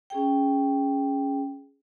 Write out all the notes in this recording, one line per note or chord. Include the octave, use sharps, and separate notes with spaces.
C#4 G#4 G5